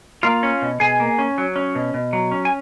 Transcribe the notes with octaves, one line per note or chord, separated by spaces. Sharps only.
A#3 F4 F5
C#4
B2
B2 G#4 G#5
A#3
C#4
F#3
C#4
B2
B2
F#3
C#4
G#5